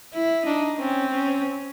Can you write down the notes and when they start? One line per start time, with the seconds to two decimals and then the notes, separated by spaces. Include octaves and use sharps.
0.13 E4
0.46 D4 D#4
0.79 C4 C#4
1.14 C#4